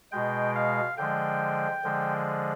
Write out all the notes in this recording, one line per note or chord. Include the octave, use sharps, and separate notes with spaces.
B2 G#3 G5
F5
D3 F3 G#3 G5
D3 F3 G#3